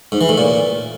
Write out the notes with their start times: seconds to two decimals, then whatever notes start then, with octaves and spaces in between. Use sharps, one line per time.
0.12 G#2
0.21 E3
0.29 A2
0.38 A#2